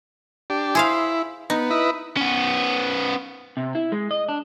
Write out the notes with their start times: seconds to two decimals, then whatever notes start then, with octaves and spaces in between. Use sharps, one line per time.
0.50 D4 G4
0.75 E4 G#4 C5 F5
1.50 B3 D#4
1.70 E4 B4 D#5
2.17 B3 C#4
3.57 C3
3.75 E4
3.92 G#3
4.11 D#5
4.29 D4